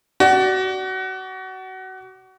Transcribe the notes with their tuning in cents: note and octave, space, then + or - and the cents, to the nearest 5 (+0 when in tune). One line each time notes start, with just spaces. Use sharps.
F#4 +25 D5 +0